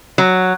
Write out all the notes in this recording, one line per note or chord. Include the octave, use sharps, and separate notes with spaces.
F#3